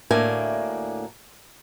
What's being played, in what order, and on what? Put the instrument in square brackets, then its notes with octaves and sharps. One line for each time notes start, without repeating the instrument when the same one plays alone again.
[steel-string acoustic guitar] D2 A2 A#3 D4 G#5